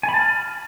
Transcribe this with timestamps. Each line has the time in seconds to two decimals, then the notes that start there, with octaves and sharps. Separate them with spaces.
0.03 G#5
0.09 B5
0.14 A5
0.19 F6